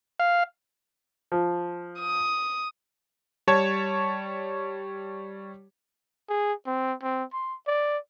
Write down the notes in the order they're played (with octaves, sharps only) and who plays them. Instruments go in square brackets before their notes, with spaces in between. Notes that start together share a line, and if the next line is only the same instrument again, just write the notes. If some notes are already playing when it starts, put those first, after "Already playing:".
[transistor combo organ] F5
[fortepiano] F3
[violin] D#6
[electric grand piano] G3 C#5 A5 G#6
[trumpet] G#4
C4
C4
C6
D5